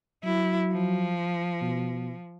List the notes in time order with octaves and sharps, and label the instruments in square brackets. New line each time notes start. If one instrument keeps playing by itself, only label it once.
[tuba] F#3 [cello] E4
[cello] F3
[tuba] B2